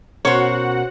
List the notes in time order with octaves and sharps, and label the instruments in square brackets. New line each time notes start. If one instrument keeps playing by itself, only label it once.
[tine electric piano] B2 C#4 A#4 [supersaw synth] F#4 F#5 [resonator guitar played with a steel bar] C5 C#5